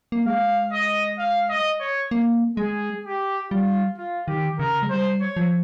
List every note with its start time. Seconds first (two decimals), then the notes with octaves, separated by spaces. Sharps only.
0.12 A#3
0.25 G#3 F5
0.72 D#5
1.19 F5
1.49 D#5
1.80 C#5
2.11 A#3
2.57 G#3 G#4
3.04 G4
3.51 G3 F4
3.98 F4
4.28 D#3 G4
4.59 C#3 A#4
4.83 G#3
4.90 G3 C5
5.21 C#5
5.37 F3